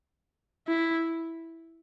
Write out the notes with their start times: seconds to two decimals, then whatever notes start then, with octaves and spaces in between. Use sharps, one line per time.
0.68 E4